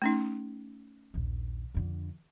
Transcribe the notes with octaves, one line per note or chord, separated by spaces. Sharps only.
A3 C#4 D#4
A#1 D#2
F2 D3